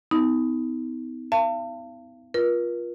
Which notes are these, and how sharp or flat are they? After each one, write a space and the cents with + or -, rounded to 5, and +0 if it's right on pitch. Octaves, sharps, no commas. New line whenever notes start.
B3 +35 D#4 +35
F5 -35 A5 +35
F4 +5 A#4 +45